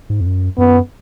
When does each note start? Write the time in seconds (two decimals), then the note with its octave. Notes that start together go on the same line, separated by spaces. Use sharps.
0.10 G#2
0.21 F2
0.26 F#2
0.58 F#2 B3